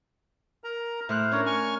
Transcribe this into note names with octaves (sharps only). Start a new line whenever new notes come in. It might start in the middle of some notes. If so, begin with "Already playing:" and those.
A#4 A#5
A2 C5 F6 F#6
C#4 D4 A#4 C#5
C#5 G#5 C#6 F6